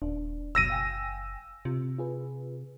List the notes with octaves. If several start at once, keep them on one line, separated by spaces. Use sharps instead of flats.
D#1 D4
F#1 C#2 B2 F#3 E6 A#6 D#7
F5 G5 G#5
C3 F4
F4 G#4 B4